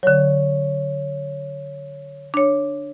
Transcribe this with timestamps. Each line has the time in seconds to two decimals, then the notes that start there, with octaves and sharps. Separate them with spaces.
0.03 D3 F#3 C#5
2.34 D4 C#5